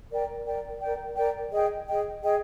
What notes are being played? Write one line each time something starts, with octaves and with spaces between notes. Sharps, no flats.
A#4 D5 G5
A#4 D5 G5
A#4 D5 G5
A#4 D5 G5
G#4 D#5 G5
G#4 D#5 G5
G#4 D#5 G5